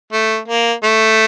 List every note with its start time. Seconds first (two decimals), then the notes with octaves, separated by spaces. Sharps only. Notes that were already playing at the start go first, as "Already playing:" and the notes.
0.13 A3
0.48 A#3
0.84 A3